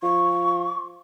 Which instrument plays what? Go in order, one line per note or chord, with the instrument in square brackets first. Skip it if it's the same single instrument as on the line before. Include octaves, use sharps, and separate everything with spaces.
[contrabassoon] F3 [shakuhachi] C#6